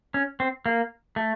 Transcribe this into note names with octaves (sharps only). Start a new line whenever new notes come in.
C#4
C4
A#3
A3